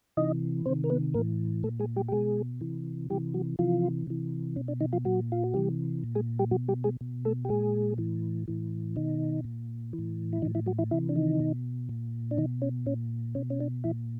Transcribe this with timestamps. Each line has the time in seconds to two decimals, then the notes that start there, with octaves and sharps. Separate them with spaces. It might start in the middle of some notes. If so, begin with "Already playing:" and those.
0.17 C3 E3 D#4 D#5
0.66 C3 C4 C5
0.70 D#3
0.84 A#4
0.90 B3 B4
1.14 A2 E3 A#3 A#4
1.63 A#2 A3 A4
1.80 G#3 G#4
1.96 G3 G4
2.08 G4
2.12 B2 G#3 G#4
2.61 C3 E3
3.10 C3 E3 G3 G4
3.34 F#3 F#4
3.59 C3 E3 F3 F4
4.07 C3 E3
4.56 B2 C#4
4.68 D4
4.81 D#3 D#4
4.93 F3 F4
5.05 A#2 F#3 F#4
5.32 F4
5.44 F#4
5.54 C3 E3 G3 G4
6.04 A#2
6.15 G#3 G#4
6.39 G3 G4
6.51 B2 F#3 F#4
6.68 G3 G4
6.84 G#3 G#4
7.01 B2
7.25 A3 A4
7.45 G4
7.49 A#2 G#3 G#4
7.98 A2 E3
8.48 A2 E3
8.96 B2 D#3 D#4
9.44 A#2
9.93 E3
9.98 A2
10.33 E4
10.42 D#3 E3 D#4
10.45 A2
10.55 E3 E4
10.66 F#3 F#4
10.79 E3 E4
10.91 C3 E3 E4
11.09 D4
11.16 D#3 D#4
11.40 B2
11.89 A#2
12.31 D4
12.37 B2 D#3 D#4
12.62 C#4
12.86 A#2 C#4
13.35 B2 C#4
13.50 C#4
13.60 D4
13.84 A#2 E3 E4